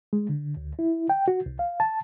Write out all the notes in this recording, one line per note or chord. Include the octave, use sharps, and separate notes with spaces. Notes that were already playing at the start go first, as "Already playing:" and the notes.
G#3
D3
D2
E4
G5
F#4
C2
F5
A5